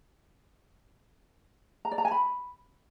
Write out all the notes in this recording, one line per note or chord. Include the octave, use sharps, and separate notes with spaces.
A#5
D5
A#5
G#5
B5